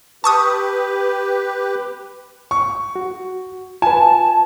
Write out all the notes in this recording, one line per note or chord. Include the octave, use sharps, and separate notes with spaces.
G4 B4 A5 C#6 D#6
C#6
F#4
F4 B4 G#5 A5